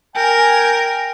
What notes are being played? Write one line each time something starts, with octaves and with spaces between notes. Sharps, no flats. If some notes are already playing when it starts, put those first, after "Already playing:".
A#4 G5 G#5